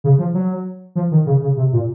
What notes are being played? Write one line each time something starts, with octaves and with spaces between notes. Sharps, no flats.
C#3
F3
F#3
F3
D#3
C#3
C#3
C3
A#2